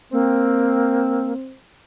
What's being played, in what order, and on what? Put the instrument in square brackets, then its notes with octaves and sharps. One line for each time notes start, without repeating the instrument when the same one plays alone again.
[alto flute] A#3 [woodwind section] C4